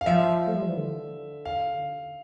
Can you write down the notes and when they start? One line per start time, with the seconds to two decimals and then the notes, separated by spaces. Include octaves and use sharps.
0.01 F5
0.06 F3 E5
0.47 A3
0.55 G3
0.62 F3
0.69 E3
0.77 D3
1.45 F5